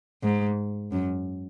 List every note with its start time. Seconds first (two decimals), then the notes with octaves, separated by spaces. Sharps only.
0.23 G#2
0.92 F#2